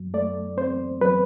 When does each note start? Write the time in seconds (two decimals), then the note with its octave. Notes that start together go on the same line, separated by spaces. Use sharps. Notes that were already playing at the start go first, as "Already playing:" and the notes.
Already playing: F#2 F#3
0.14 A3 D5
0.57 C4 C5
1.01 F#3 B4